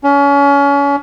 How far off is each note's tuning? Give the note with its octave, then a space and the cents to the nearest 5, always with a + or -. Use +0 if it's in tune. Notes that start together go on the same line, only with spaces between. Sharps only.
C#4 +30